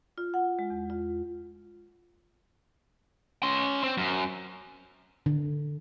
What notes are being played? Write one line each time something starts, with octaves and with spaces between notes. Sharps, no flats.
F4
F#5
G#3
E2
F4
C#4 C6
C4
F#2
D3